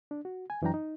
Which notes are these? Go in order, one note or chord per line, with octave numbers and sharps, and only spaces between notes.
D4
F#4
G#5
F#2 E3 F#3 D4 G5 A#5
D#4